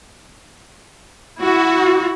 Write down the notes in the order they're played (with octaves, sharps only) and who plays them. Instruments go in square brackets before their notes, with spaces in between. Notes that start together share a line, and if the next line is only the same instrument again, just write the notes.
[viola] E4 [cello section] F#4